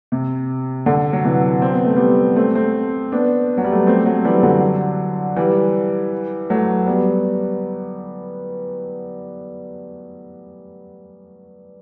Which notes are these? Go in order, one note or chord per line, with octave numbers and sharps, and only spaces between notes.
C3
D3
F#3
C3 E3
C4
B3
A3
G3 B3
A3 C4
A3 C4
B3 D4
F#3
G3
A3
B3
A3 C4
F#3 A3
E3 G3
D3 F#3
E3 G3
F#3 A3
G3 B3